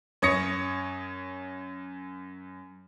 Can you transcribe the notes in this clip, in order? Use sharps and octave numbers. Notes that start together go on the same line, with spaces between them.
F#2 C#5 C#6 D#6 A#6 C#7